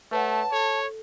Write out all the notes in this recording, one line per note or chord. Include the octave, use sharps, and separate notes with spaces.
A3 B4 C#5 F#5 A5
A4 C#5